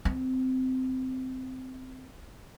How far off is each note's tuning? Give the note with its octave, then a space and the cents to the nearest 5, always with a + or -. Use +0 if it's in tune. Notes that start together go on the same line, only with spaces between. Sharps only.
C4 -15